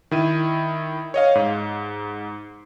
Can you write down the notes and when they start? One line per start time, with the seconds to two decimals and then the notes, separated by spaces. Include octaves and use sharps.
0.11 D#3 E4 D#7
1.14 C#5 D#5 F5
1.35 G#2